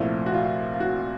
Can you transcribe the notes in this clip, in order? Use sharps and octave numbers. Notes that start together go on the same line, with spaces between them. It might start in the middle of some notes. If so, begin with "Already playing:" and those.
Already playing: C2 A#2 F3 A3 E4
F#4
F4
F4
F#4